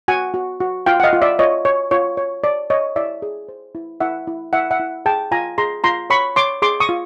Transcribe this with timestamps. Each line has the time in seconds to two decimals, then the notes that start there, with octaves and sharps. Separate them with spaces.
0.08 F#4 F#5 G#5
0.34 F#4
0.60 F#4
0.86 F4 F5 G5
1.00 F#5
1.04 D#5 F5
1.13 F4
1.22 D5 E5
1.39 F4 C#5 D#5
1.65 C#5
1.91 F4 C#5
2.17 C#5
2.44 C#5 D5
2.70 C#5 D#5
2.96 E4 D5 E5
3.22 G#4
3.49 C5
3.75 E4
4.00 E4 E5 F#5
4.27 E4
4.53 E4 E5 F#5
4.71 E5 F#5
4.80 E4
5.06 G#4 G5 A5
5.32 F4 G#5 A#5
5.58 G#4 A#5 C6
5.84 F4 A#5 C6
6.10 C#5 B5 C#6
6.36 C#5 C6 D6
6.62 G#4 C6 D6
6.80 C#6 D#6
6.89 F4